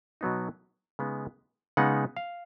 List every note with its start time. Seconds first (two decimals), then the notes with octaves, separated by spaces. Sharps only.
0.21 B2 F#3 B3 D#4
0.99 C#3 G#3 B3 D#4
1.77 C#3 G#3 B3 D#4 F#5
2.17 F5